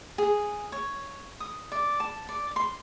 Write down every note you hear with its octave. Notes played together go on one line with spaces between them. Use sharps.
G#4
C#5
D#6
D5
A5
D5
C6